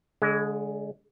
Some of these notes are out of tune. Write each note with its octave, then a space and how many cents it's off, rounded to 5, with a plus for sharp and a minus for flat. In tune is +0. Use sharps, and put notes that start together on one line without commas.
D3 -40 G#3 +0